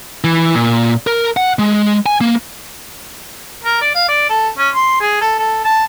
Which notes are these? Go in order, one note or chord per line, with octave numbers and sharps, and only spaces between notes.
E3
A#2
A#4
F#5
G#3
G#5
A#3
A#4
D5
F5
D5
A4
C#4
C6
G#4
A4
A4
A5